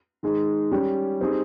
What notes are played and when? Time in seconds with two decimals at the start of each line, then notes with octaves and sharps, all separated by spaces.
0.23 D#3 G#3 D#4 G#4
0.71 G3 C#4 G4
1.20 G3 C4 D#4 G#4